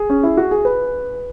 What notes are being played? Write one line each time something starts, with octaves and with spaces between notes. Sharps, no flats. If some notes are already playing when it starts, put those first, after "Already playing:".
Already playing: G#4
C#4
E4
F#4
G#4
B4